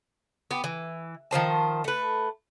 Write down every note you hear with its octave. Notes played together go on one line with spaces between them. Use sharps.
B3 G4
E3
D#3 F3 C5 A5
A3 B4